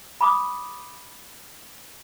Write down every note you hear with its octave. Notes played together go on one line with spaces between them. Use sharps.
B5 D6 D#6